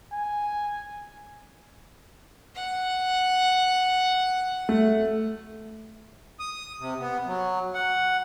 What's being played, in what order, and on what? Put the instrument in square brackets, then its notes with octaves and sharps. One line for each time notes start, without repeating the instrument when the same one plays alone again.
[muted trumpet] G#5
[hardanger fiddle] F#5
[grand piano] A3
[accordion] D#6
C3
B3
F#3
F#5